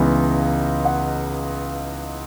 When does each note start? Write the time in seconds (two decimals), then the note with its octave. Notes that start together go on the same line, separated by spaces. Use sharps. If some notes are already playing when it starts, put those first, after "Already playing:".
Already playing: C#2 C#3 E3 B3 D#4
0.84 F#5